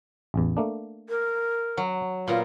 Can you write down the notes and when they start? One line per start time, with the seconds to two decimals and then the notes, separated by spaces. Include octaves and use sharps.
0.34 A1 E2
0.57 A3 A#3 D4
1.09 A#4
1.77 F#3
2.28 A#2 B3 F4 A#5